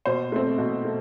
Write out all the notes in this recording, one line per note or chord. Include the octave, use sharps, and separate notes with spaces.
B2 C5
A3 C4
B2
A3